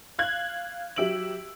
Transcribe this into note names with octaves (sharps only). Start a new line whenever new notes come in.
F5 F#6 G#6
F#3 G4 E5 E6 D7 F#7